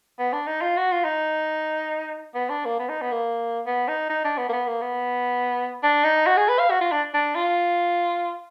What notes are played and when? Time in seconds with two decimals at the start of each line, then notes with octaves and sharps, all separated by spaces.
0.19 B3
0.33 D4
0.47 D#4
0.61 F4
0.77 F#4
0.91 F4
1.05 D#4
2.35 B3
2.49 D4
2.65 A#3
2.79 B3
2.89 D#4
3.01 B3
3.12 A#3
3.66 B3
3.88 D#4
4.10 D#4
4.24 D4
4.38 B3
4.49 A#3
4.53 B3
4.67 A#3
4.81 B3
5.83 D4
6.04 D#4
6.26 F#4
6.37 G#4
6.49 B4
6.59 F5
6.70 F#4
6.81 F4
6.92 D4
7.14 D4
7.35 F4